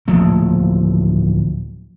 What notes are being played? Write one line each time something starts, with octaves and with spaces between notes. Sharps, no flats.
D1 F3 A3 A#3